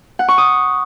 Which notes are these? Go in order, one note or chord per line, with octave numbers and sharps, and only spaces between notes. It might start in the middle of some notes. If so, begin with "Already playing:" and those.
F#5
C#6
D#6